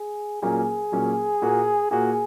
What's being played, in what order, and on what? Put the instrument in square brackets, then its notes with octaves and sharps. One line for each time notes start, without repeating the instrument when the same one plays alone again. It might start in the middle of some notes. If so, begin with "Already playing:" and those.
Already playing: [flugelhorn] G#4
[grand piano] A#2 F#3 A#3 C#4 [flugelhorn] G#4
[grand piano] A#2 F#3 A#3 C#4
A#2 A#3 F#4
[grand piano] A#2 A#3 F#4 [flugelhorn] G#4